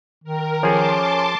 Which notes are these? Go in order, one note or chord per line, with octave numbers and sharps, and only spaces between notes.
D#3 A#4
F3 C#4 G#4 A4 A5 C6 D6